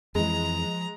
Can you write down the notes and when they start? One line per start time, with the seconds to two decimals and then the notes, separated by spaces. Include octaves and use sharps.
0.15 F2 E3 F3 G#3 A#5